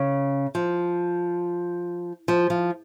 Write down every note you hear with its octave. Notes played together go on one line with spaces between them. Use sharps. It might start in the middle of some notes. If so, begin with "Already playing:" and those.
Already playing: C#3
F3
F3
F3